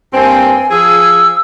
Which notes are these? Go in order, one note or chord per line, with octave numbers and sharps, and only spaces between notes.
G2 A#3 C4 G#5
F3 G#4 E6